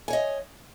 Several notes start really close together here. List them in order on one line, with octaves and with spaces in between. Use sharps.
G#5 C#5 D#5